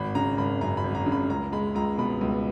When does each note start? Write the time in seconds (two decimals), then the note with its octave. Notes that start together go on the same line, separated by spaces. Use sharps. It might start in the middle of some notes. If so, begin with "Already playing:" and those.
Already playing: G#1 B5
0.15 C#3 A#5
0.37 G#1 B5
0.61 F#2 A#5
0.77 B5
0.84 G#1
0.95 A#5
1.06 C#3
1.12 B5
1.29 C#2 A#5
1.52 G#3 B5
1.75 C#2 A#5
1.98 B2 B5
2.21 C#2